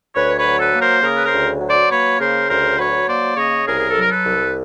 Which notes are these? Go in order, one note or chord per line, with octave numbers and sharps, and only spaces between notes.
D2 B4 C#5
B4 C#5
F#3
A4 B4
A#3
A#4 C5
C#3 G#4 A#4
B4
A#4 C5
D2
F#3
C5 D5
A#3 B4 C#5
C#3 A#4 C5
D2 A#4 C5
F#3 B4 C#5
A#3 C5 D5
C#3 C#5 D#5
C2 G#4 A#4
G#4
A4
F#3 A#4
A4 B4
C2